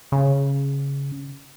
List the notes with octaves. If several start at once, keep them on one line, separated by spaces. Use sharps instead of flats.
C#3